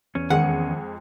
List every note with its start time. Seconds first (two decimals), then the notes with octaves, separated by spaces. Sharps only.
0.15 E2 C#4
0.30 F2 D#3 G#3 F#5 C#7